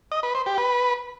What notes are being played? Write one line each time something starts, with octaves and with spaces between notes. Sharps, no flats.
D#5
B4
C5
G4
B4